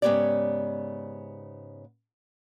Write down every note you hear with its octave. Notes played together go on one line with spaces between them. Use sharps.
G#2 C#3 B3 G4 C#5 D5